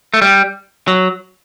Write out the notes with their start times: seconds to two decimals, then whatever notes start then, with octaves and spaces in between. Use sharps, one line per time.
0.14 A3
0.22 G3
0.88 F#3